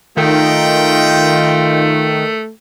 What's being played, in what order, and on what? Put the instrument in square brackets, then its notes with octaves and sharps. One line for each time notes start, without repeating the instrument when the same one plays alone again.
[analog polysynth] D#3 [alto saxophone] A3 [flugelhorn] F4 [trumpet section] D#5 G5